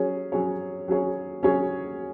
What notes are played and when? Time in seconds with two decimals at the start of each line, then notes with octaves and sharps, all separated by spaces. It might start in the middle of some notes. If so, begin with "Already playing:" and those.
Already playing: F#3 C#4 G#4 C#5
0.32 F#3 C#4 G#4 C#5
0.88 F#3 C#4 G#4 C#5
1.43 F#3 C#4 G#4 C#5